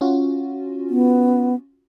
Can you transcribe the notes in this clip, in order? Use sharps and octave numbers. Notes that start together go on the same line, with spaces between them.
C#4 F4 F#4
B3